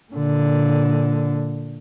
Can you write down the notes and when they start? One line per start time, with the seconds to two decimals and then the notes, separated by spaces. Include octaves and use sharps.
0.12 A#2 D3